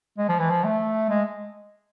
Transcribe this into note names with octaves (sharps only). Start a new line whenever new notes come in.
G#3
F3
E3
F3
A3
G#3